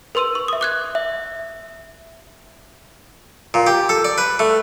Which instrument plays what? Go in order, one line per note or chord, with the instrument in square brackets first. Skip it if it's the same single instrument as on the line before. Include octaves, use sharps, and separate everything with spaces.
[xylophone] A#4 B4 C6 E6 D#7
C#6
E5 D#6
D6 F#6 G#6
[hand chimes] E5
[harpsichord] A#2
G4
A4
D5
B4
A3